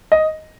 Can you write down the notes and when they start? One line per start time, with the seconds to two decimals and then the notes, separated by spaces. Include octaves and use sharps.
0.12 D#5